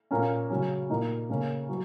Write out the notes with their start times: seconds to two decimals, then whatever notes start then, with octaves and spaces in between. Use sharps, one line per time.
0.11 A#2 A#3 C#4
0.50 C#3 F#3 C#4
0.90 A#2 A#3 D#4
1.29 C#3 A#3 C#4
1.69 F#3